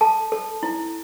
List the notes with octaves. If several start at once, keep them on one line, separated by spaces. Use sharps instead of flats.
A4 A5
A4
E4